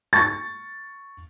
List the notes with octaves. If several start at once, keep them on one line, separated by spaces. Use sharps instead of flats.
C#6 A6